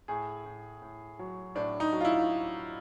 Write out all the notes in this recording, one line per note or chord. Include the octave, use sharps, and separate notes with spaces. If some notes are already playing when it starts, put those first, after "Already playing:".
A2 G#4
A2
A2
F#3
A2 D4
D#4
F#3
F4
E4